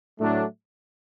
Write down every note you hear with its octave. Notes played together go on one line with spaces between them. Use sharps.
A2 F#3 A3 D4